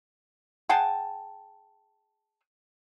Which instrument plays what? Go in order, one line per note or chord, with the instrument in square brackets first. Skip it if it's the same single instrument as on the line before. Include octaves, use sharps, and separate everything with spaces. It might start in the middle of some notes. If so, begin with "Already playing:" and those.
[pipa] G#4 F#5 G5 A5